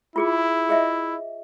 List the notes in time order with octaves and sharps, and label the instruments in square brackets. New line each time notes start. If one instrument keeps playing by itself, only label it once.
[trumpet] E4 [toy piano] F4 G#4 D6
[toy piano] G#4 D#5 E5